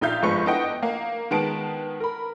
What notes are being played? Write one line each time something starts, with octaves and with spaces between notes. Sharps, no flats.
A#1 D#4 F4 E5 F5 G6
G1 G#2 F3 B4 C#6 C#7
B3 D4 E4 D#5 F#5 G5
A#3
D#3 G#3 B3 A5 D7
A#4 B5